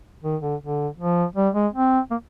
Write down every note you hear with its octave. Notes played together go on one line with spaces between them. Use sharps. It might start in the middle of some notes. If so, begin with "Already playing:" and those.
D#3
D3
D3
F3
G3
G#3
C4
A#3